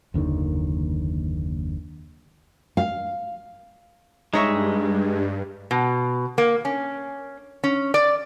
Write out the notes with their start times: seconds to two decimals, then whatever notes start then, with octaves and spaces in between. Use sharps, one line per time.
0.14 F#1 D#2 D3 D#3
2.77 F5
4.34 G2 G#3 D#4 C#5 E5
5.71 B2
6.38 A#3
6.65 C#4
7.64 C#4
7.94 D5